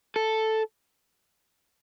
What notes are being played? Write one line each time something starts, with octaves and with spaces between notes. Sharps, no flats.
A4